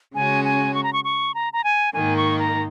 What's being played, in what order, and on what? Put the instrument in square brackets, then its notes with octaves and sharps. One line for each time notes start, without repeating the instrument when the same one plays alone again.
[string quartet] C#3 G#3 C#4 F#4 [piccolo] G#5
[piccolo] G#5
C#6
A#5
C#6
C#6
A#5
A#5
G#5
[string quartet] G#2 D#3 A#3 D#4 [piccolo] G#5
[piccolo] C#6
A#5